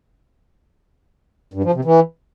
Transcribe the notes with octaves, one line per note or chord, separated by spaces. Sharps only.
G2
F3
C3
E3